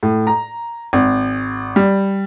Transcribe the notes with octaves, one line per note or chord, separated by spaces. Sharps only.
A2
A#5
G#1
G3